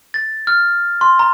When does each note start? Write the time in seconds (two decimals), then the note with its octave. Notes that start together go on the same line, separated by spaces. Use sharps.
0.14 A6
0.47 F6
1.01 C6
1.19 A#5